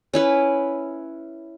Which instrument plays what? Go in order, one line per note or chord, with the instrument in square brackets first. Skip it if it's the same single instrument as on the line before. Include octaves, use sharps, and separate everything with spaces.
[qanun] C#4 E4 B4